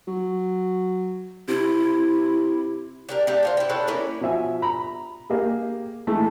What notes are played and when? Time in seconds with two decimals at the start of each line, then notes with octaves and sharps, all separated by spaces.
0.08 F#3
1.48 C3 E4
3.09 D4 G4 A#4
3.27 A3 D4 G4
3.43 D4 F4 C5
3.57 E4 G5
3.69 C#4 A4 B4 C5
3.87 A#3 C#4 E4
4.21 B2 F3 E5 G#5
4.62 A#5 B5
5.30 A#3 G4 G#4
6.07 E3 G#3 A3